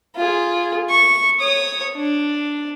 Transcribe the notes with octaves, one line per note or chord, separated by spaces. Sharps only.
F4 G#4
C#6
C#5 D#6
D4